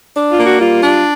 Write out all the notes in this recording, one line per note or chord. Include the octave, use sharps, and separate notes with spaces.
D4
F4
A#3
F#4
G3 F4
D4